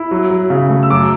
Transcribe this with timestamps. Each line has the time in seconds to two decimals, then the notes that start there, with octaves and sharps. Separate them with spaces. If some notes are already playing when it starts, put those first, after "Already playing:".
Already playing: E4
0.11 F#3
0.30 F#3
0.50 C#3
0.70 A3
0.83 E6
0.90 F#2 D6